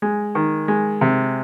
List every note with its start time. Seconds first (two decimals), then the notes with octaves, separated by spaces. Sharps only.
0.02 G#3
0.35 D#3
0.68 G#3
1.01 C3